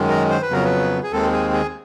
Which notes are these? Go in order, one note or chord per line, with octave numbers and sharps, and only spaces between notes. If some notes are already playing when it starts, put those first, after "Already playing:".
Already playing: F#2 D#3 G#3
A#4
C5
B4
F2 C#3 F#3 B3 A#4
B4
G#4
D#2 D#3 G#3 C4 A4
G#4
G#4